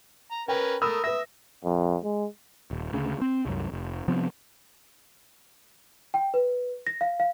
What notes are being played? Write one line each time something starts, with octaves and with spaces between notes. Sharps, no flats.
A#5
C#4 A#4 B4 G5
A3 A#4 B5 D#6 E6
B4 E5 A#6
F2
G#3
D#1
D2 C#3
C4
C2 F#2
F1
C3 F3 B3 C4
G5
B4
A#6
F5
F5